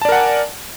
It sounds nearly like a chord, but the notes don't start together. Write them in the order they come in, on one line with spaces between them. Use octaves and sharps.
A5 D5 A#4 F#5 G#5